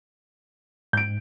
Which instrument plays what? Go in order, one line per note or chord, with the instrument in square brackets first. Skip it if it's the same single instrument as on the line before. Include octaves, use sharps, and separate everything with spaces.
[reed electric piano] G#2 [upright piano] G6 D7